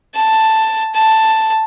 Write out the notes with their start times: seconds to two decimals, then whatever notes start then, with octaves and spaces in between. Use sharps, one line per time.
0.15 A5
0.95 A5